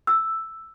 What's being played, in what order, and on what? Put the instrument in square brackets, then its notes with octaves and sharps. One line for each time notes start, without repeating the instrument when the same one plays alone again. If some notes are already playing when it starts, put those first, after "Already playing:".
[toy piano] E6